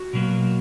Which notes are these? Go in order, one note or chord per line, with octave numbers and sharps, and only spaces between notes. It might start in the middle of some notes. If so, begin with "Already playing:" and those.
Already playing: F#4
B2 F#3 A#3